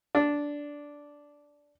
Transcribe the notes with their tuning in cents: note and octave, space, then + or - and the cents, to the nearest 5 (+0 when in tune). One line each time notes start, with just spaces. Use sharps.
D4 -10